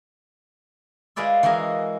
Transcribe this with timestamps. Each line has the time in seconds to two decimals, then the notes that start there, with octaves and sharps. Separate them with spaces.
1.16 G#3 F4 G#4 B4 D5 E5
1.43 E3 G#3 F#4 A#4 D#5 F5